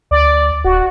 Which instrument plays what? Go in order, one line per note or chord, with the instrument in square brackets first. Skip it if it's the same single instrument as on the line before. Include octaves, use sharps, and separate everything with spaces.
[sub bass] D2 [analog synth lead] D5
[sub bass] D1 [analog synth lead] F#4